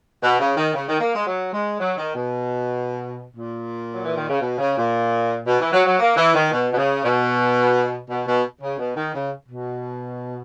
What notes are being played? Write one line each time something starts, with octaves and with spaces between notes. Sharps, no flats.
B2
C#3
D#3
C#3
D#3
A#3
G#3
F#3
G#3
F#3
D#3
B2
A#2
F#3
E3
D#3
C#3
B2
C#3
A#2
B2
E3
F#3
F#3
A#3
E3
D#3
B2
B2
C#3
B2
B2
B2
C#3
B2
D#3
C#3
B2